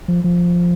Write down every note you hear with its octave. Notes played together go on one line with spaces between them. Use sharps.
F3
F3